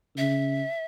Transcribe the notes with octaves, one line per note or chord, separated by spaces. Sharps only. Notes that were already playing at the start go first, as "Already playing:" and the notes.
C#3 E5